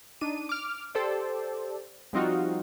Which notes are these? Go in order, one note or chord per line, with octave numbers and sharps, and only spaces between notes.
D4 D#4 D#7
D6 F6
G4 A4 C5 D5
F3 G3 C4 D#4 F4 F#4